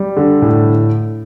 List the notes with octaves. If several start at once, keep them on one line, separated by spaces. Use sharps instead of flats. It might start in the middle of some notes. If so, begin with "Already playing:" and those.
Already playing: G3
D3
A2